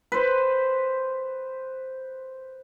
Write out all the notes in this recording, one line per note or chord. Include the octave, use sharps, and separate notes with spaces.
B4 C5